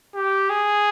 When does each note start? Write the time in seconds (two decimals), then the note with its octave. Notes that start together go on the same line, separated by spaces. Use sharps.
0.15 G4
0.50 G#4